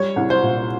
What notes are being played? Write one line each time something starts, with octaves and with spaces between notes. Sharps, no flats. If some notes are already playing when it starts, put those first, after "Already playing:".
Already playing: G3 C#5
C2
C5
A#2